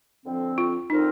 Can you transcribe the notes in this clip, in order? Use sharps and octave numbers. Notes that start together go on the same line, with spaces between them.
F2 D3 F3 C4
F4
D3 F3 C4 D#4 F4 A#4